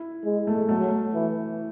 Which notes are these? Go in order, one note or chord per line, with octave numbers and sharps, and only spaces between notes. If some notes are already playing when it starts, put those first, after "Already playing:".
Already playing: E4
G#3
A3
F#3 A3
E3